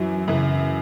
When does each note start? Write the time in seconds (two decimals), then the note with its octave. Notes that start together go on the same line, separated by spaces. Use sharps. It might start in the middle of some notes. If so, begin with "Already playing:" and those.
Already playing: F#2 E3 F#3
0.28 F#2 C#3 E3